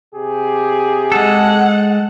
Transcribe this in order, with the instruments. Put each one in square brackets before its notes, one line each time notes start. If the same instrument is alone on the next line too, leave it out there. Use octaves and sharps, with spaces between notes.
[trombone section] C3 G4 G#4
[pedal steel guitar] G#3 A4 [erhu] F#5